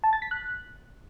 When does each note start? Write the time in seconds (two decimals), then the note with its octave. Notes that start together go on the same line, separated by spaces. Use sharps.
0.04 A5
0.13 A6
0.22 B6
0.31 F#6